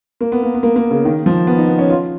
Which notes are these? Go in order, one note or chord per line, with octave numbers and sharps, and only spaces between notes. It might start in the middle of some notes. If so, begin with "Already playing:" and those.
A#3
B3
A#3
B3
A#3
A#3
C#3
D#3
F3
B3
D#4
B3
C#4
F4